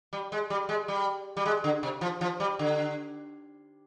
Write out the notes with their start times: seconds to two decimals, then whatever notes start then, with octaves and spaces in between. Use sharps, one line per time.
0.13 G3
0.32 G#3
0.50 G3
0.69 G#3
0.88 G3
1.37 G3
1.46 G#3
1.64 D3
1.83 C3
2.01 F3
2.21 F3
2.40 G3
2.59 D3